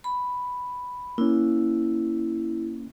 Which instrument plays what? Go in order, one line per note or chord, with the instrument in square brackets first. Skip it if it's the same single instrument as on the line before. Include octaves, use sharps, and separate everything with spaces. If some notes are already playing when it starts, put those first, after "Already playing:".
[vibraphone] B5
[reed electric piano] A#3 C#4 [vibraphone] E4